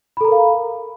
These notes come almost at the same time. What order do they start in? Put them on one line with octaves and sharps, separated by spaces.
B5 A4 A#5 A#4 F5